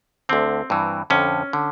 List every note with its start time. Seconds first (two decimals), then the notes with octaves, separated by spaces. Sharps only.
0.29 D2 D3 C4
0.70 G2 E3
1.10 F2 D3 C#4
1.53 D3